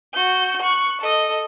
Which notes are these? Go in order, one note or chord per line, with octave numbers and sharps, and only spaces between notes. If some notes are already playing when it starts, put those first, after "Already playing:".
F#4 G6
C#6 F#6
A4 D#5